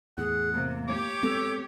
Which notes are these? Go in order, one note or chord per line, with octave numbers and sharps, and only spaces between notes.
E2 A2 G#4 F#5
C3 A#3
G4 C#5 D6
G#3 B3 C4 A4